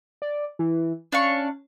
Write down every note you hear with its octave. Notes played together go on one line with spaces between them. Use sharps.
D5
E3
C#4 D4 F5 C#6